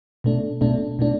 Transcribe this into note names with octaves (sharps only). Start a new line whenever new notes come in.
B2 A3 D4
B2 A3 D4
B2 A3 D4